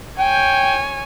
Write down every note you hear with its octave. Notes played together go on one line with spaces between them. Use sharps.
C#5 G5 G#5